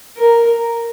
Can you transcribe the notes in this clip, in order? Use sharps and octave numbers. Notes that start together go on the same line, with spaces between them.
A#4